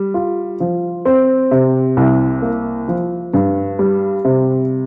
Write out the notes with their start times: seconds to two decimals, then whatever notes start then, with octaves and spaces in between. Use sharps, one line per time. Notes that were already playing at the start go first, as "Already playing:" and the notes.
Already playing: G3
0.14 F4
0.60 F3
1.05 C4
1.51 C3
1.97 C2
2.42 A#3
2.88 F3
3.33 G2
3.79 G3
4.24 C3